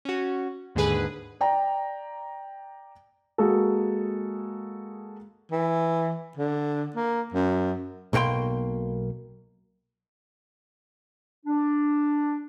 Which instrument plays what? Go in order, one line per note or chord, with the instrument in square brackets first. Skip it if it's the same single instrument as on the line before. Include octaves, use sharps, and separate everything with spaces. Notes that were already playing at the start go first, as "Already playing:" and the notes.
[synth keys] C#4 F#4
D#2 G#2 D3 G#4 B4
[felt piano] D5 G5 A#5
[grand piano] G#3 A#3 F#4 G#4 A4
[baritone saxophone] E3
D3
A#3
F#2
[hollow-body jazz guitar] B1 B2 A#3 G5 C6
[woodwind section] D4